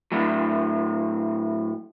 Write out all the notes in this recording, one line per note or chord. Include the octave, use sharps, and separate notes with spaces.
A2 F#3